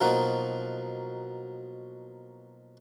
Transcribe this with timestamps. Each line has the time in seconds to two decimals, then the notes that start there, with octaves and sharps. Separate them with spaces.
0.01 B2 F3 F#3 A#3 D#4 F#4